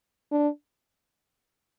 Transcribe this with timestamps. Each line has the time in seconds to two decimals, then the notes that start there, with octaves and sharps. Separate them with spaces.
0.32 D4